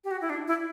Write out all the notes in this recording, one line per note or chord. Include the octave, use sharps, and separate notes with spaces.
G4
F#4
E4
D4
E4